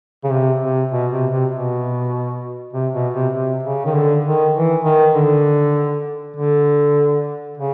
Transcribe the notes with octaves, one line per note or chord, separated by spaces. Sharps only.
C#3
C3
C3
B2
C3
C3
B2
C3
B2
C3
C3
C#3
D#3
D3
D#3
E3
D#3
D3
D3
C#3